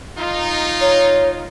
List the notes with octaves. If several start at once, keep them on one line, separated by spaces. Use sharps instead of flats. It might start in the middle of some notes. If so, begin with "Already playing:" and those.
D#4 F4
C#5